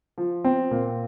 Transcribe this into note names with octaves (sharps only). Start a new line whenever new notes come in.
F3
C4
A#2